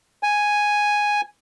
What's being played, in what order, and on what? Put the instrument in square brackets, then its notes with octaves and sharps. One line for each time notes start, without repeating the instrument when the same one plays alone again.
[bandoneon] G#5